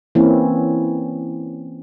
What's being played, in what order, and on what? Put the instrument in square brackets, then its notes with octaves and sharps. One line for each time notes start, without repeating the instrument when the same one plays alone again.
[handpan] E3 A#3 C4 C#4 E4